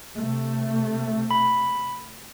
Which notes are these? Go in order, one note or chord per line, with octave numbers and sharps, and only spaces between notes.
C3 A3
B5